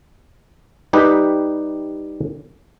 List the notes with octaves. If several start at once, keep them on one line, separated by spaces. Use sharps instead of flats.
G3 D#4 G4 B4